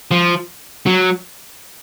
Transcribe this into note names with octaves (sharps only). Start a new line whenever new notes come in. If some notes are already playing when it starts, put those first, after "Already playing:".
F3
F#3